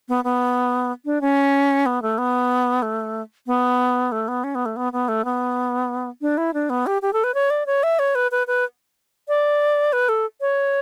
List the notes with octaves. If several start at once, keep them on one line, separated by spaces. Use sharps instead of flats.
B3
B3
D4
C#4
B3
A3
B3
A3
B3
A3
B3
C#4
B3
A3
B3
B3
A3
B3
D4
E4
D4
B3
G4
G4
A4
B4
C#5
D5
C#5
E5
C#5
B4
B4
B4
D5
B4
A4
C#5